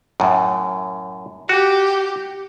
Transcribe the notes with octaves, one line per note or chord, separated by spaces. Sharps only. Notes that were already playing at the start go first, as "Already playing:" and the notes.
F#2 A2
F#4 G4